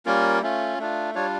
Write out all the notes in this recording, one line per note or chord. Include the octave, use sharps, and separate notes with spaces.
G3 A#3 C#4 F4 A#4
A3 C#4 F4
A3 D4 F4
G3 D4 F4 C#5